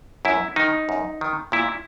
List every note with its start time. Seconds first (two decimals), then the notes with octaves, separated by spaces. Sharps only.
0.25 F#2 E4
0.56 D#3 D#4
0.89 F#2
1.21 D#3
1.52 A#2 E4